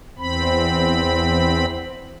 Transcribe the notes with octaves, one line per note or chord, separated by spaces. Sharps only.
E2 C4 B5